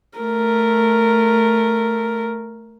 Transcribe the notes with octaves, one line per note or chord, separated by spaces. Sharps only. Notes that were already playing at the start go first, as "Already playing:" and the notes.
A3 A#4